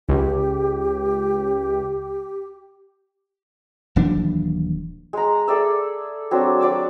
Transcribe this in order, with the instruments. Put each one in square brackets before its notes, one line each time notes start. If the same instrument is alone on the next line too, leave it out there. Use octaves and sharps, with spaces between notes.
[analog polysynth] C#2 [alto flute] G4
[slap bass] D#1 E3 F#3 D4
[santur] G#3 A#5
G#4 A4 D5 E5
F#3 C4 D4
F#3 D5 D6 E6